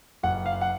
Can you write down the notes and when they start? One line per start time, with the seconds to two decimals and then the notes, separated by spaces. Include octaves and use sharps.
0.23 F#1 F#5
0.46 F5
0.61 F#5